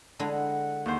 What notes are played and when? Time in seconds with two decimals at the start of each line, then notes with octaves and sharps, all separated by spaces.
0.19 D3 G#3 E4 A5
0.32 F#5
0.86 D#2 C5